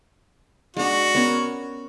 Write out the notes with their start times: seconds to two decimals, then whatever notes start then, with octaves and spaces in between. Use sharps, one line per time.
0.77 G#3 D4 F#4
1.15 B3 C#4 A#4